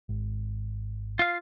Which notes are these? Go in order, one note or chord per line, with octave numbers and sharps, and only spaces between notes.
G#1
F4 F5